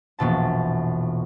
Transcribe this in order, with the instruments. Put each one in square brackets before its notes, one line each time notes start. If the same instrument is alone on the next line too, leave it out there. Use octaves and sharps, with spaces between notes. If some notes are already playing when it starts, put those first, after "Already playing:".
[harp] E1 A#1 B2 A5